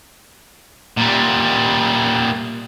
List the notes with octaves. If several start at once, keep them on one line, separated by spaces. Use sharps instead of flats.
A#2 G3